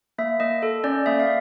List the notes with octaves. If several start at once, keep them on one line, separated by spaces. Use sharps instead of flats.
A#3 E5
A#3 D#5
A4
C#4 D5
A#3 E5
F5